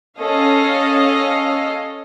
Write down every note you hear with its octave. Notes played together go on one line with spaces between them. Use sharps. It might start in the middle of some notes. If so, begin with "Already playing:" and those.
C#4 A4 D#5 F5